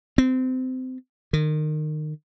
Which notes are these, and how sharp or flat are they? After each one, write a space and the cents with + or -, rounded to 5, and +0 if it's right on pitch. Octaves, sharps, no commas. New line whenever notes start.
C4 -25
D#3 -25